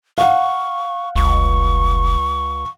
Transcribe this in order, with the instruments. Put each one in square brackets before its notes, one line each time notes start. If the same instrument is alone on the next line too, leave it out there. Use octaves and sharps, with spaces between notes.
[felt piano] F5 F#5 [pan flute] C#6
[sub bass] F1 [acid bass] C#2 [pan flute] C#6